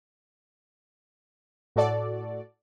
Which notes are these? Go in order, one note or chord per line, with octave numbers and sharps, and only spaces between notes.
A2 F#4 A4 D5